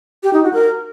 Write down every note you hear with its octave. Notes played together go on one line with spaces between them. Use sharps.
G4
D#4
F#4
A#4